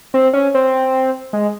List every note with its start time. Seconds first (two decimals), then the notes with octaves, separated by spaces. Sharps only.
0.14 C4
0.33 C#4
0.54 C4
1.33 G#3